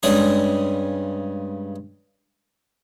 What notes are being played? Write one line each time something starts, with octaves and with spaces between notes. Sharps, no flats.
G2 C#3 G#3 G#4